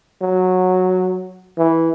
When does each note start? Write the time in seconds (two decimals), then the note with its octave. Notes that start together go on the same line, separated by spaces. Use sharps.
0.21 F#3
1.58 E3